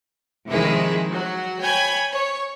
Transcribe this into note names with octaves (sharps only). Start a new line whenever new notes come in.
C3 D#3 F3 G#3 E4 G#4
F#3 F#4
C#5 G5 G#5 B5 G#6
C#5